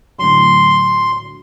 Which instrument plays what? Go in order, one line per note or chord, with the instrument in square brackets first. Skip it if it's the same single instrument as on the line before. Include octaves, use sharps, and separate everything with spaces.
[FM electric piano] A2 D3 F#3 [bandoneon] C6